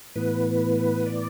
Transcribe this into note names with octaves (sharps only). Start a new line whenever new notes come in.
A2 E3 B3 B4
D5